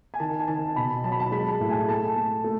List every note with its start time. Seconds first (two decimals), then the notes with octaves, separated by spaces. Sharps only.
0.14 G#5
0.20 D#3 A5
0.39 G#5
0.48 D#3 A5
0.76 B2 B5
1.04 F#3 A5
1.12 B5
1.20 A5
1.32 G#3 B5
1.50 A5
1.60 A2
1.70 G#5
1.88 A3 A5
2.16 A3
2.44 A3